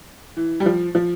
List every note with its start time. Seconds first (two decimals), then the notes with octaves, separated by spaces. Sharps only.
0.37 E3
0.60 G3
0.66 F3
0.95 F3